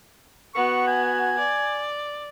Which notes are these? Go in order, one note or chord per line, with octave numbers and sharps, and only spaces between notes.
B3 F#4 C#6
G#5
D5